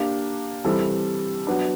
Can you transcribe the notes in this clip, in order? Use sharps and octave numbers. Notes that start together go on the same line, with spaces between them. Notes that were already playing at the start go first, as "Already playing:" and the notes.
Already playing: A#3 D4 G4
E3 G3 C4 E4 A4
F#3 B3 D4